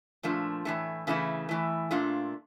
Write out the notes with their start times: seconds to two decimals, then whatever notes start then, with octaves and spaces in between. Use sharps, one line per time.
0.23 A#2 F3 A3 D4
0.65 A2 E3 A3
1.07 C#3 E3 A3 E4
1.49 A2 E3 A3
1.91 A#2 A3 D4 F4